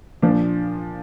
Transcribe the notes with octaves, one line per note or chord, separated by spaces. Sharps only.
A#2 F3 D4